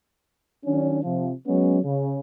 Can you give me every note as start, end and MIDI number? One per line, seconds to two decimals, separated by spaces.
0.65 0.99 51
0.65 0.99 54
0.65 0.99 61
0.65 0.99 62
1.04 1.31 48
1.04 1.31 53
1.47 1.79 54
1.47 1.79 56
1.47 1.79 59
1.47 1.79 61
1.83 2.20 49